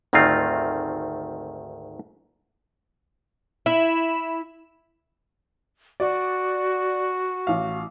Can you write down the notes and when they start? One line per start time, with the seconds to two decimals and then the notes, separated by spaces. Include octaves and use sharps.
0.13 G#1 D2 D#3 A3 C4 F4
3.66 E4
6.00 F#4 D5
7.47 A1 F5